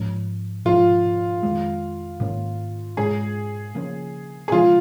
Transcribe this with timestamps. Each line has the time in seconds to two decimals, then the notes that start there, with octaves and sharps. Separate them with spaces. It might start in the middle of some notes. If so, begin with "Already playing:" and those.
Already playing: G#2 F3 C#4
0.65 G#2 F3 C#4 F4
1.43 F2 D#3 G#3
2.20 G#2 D#3 A#3 C#4
2.97 G#2 G#3 C#4 G#4
3.75 C#3 F3 A#3 C#4
4.48 G#4
4.52 C#3 F3 G#3 C#4 F4